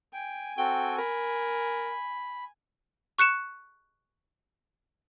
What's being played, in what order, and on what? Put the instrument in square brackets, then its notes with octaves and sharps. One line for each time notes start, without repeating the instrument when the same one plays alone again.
[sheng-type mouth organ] G5 [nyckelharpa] G#5
[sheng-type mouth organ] C4 F#4 A4 [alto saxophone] G5
[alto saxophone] A#4 [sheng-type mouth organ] B5
[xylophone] C#6 F#6 C#7 E7